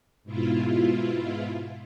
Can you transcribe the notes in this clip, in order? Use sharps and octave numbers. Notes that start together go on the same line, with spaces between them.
G#2 B2 E4 F4